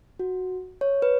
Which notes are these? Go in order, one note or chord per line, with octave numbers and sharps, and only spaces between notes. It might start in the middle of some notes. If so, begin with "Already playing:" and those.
F#4
C#5
B4